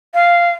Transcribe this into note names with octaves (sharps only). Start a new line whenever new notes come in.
F5